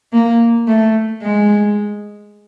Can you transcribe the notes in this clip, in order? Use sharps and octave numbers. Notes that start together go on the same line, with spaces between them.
A#3
A3
G#3